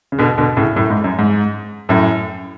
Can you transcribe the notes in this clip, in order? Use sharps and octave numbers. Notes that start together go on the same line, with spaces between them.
C#3
B2 D3
B2 D3
A2 C#3
F#2 A2
G#2
F#2
G#2
F#2 A2